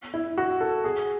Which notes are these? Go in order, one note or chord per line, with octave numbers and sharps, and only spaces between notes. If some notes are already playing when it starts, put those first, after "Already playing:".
E4
F#4
A4
G#4